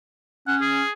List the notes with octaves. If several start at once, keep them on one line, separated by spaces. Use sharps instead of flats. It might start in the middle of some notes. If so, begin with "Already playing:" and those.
C#4 F#5
G#4